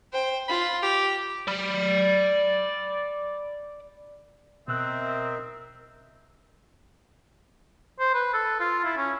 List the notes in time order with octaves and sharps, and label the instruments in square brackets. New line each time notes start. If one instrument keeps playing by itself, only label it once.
[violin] C5 G5
[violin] F4 [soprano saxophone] B5
[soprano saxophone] G4 [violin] F7
[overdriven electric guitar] D5 B5
[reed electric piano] B2 E6 F#6 [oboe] C4 [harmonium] A#4 D#5 E5
[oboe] C5
B4
A4
F4
E4
C#4